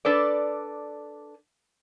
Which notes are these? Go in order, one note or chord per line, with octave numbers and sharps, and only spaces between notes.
D4 A4 B4 D5